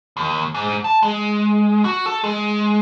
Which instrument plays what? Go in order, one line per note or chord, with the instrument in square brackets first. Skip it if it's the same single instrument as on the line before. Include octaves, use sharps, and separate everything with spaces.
[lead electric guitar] D#2
G#2
A5
G#3
F#4
A4
G#3